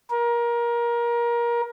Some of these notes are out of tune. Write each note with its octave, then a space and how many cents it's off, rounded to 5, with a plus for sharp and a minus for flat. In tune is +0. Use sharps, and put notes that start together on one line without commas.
A#4 +25